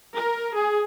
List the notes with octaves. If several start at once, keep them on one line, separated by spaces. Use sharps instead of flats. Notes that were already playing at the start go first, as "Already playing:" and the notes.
A#4
G#4